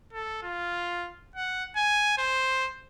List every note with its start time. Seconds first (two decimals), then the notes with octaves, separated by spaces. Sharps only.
0.13 A4
0.42 F4
1.36 F#5
1.76 G#5
2.18 C5